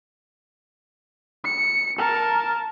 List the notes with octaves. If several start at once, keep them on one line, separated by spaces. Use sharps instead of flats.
C#7
A#4 A5